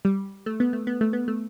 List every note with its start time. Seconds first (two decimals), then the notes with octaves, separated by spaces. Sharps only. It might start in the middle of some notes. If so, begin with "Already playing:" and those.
0.05 G3
0.46 A3
0.60 B3
0.73 A3
0.87 B3
1.01 A3
1.13 B3
1.28 A3